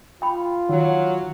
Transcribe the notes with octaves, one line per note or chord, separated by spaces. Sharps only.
F4 G5 B5
D#3 F#3